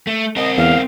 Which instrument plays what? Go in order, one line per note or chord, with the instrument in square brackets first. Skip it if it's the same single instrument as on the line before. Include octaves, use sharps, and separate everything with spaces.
[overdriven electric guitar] A3
[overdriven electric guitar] C4 A#4 [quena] D#5
[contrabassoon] E2 [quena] F5